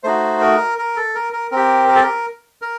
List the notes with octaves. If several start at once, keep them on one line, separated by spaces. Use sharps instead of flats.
A3 D#4 F#4 C5
A#4
A#4
A4
A#4
A#4
C4 G4 A#4
A#4
A4
A#4
A#4